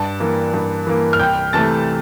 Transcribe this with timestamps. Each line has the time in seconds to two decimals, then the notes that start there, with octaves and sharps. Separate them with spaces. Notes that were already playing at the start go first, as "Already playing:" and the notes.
Already playing: G2 A5
0.20 E3 A#3
0.54 G2
0.87 E3 A#3
1.13 F6
1.20 C2 G5 G6
1.53 C3 E3 A3 A5 A6